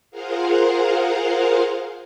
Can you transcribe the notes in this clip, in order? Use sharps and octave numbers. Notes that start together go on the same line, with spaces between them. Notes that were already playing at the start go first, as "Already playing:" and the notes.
F4 G#4 A#4 C5 F5 F#5